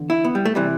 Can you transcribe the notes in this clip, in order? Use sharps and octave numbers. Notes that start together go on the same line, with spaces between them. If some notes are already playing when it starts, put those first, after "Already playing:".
Already playing: E2 D3
E4
B3
G3
A3
C3 E3 G3